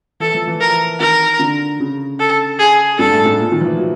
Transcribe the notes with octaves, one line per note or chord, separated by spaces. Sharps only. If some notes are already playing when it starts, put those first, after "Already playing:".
E3 A4
F3
E3
A#4
D#3 A#4
D3
C#3
A4
G#4
G2 A4
A2
G#2
A#2
D#3
F3
E3
F#3